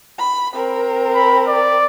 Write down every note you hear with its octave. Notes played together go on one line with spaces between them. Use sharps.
B5
C4 A#4
B5
D5